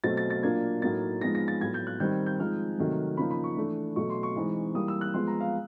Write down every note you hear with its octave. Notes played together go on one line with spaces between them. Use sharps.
B2 F#3 A3 C4 A6
A6
A6
A#2 F#3 A#3 D4 G#6
A2 F#3 A#3 D#4 A6
F3 G#3 B3 D#4 A#6
A#6
A6
A2 F#3 B3 G#6
G6
F#6
D#3 G3 C4 D#4 G6
G6
F3 G#3 C4 D#4 F6
C3 D#3 F#3 A3
C#3 F3 A#3 D#4 B5
B5
C#6
E3 A3 D4
B2 F#3 A3 C#6
C6
C#6
E3 G#3 C4 D#4
E3 G3 A#3 D#6
E6
F#6
F3 G#3 B3 C6
A#5
F5